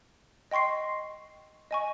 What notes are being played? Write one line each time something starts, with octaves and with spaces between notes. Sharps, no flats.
D#5 G5 C6 C#6 C7
D#5 G#5 C#6